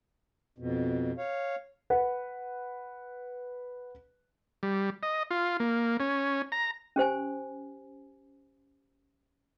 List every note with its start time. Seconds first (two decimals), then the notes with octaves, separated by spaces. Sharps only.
0.58 F2 B2
1.18 C#5 F5
1.90 B4 F#5
4.63 G3
5.03 D#5
5.31 F4
5.60 A#3
6.00 C#4
6.52 A#5
6.96 C#4 G4 C5 G#5